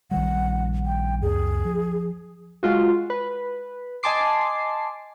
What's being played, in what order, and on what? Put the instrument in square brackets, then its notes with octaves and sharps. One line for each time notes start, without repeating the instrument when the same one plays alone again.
[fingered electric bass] A#1 D#3 G3 [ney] F#5
[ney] G5
[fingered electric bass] C#2 F#2 [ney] G#4
[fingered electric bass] F3
[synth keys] G#3 F4 F#4
B4
D#5 G#5 A5 C6 D6 C7